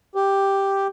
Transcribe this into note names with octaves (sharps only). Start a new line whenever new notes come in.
G4